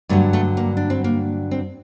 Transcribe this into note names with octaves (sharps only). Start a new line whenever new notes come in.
G2 D3 F#3 A3
A3
A#3
D4
C4
A#3
C4